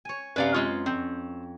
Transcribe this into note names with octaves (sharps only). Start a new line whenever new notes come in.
C#5 G#5
F#2 C3 B3 B4 D5 F5
G#3 F4 C#5 B5 C6
F2 C4